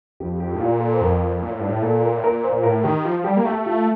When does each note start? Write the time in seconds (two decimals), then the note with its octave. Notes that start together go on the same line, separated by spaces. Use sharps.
0.20 F2 G4
0.40 G4
0.54 A2 G4
0.60 A#2 F4
0.80 A4
0.94 C5
1.01 F2 A#4
1.42 A#2
1.50 A2
1.60 G2
1.69 A2
1.82 A#2 A4
2.03 A#4
2.17 A2
2.23 A#2 A#4
2.44 C5
2.52 A#2
2.63 A2 A#4
2.84 D#3 G4
3.05 F3 F4
3.19 F3
3.25 G3 G4
3.37 A#3
3.45 A3 G4
3.66 F4